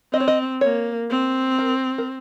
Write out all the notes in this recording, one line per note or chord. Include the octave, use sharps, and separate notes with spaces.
C4 D#5
C#5
D#5
A#3 C#5
C4
A#4
A#4